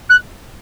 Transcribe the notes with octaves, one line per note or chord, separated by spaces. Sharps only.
F#6